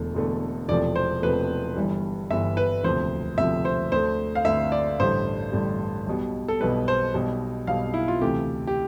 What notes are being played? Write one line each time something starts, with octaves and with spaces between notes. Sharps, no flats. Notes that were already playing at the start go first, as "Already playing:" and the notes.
Already playing: E1 E2 D3 A3
E1 E2 D3 A3
E1 E2 C3 F3 A3 D5
C5
E1 E2 C3 F3 A3 B4
G1 G2 E3 G3
G1 G2 E3 G3 E5
B4
E1 D2 C3 F3 C5
E1 D2 C3 F3 E5
C5
D2 D3 A3 C5
F5
D2 D3 A3 E5
D5
A1 G2 D3 G3 C5
A1 G2 D3 G3
B1 B2 G3
A4
B1 B2 G3 B4
C5
B1 B2 G3
B1 B2 G3 F5
E4
F4
D2 C3 E3 A3 G4
G4